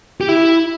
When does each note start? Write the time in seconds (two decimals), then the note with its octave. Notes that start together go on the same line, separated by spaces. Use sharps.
0.21 G4
0.29 E4